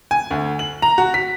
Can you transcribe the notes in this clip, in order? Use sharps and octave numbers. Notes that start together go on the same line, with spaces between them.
G#5
D2
F#7
A#5
F#4
B6